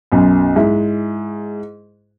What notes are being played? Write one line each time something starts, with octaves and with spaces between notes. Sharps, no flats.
B1 F#2
G#2 E4